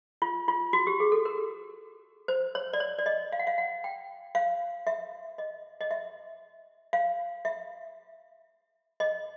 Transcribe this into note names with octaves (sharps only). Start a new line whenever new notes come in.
F4
F4
F#4
G4
G#4
A4
A#4
C5
C#5
D5
C#5
D5
D#5
F5
F#5
F5
F#5
G5
F5
E5
D#5
D#5
E5
F5
E5
D#5